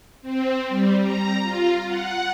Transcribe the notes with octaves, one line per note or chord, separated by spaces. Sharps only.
C4
G3
A#5
F4
F#5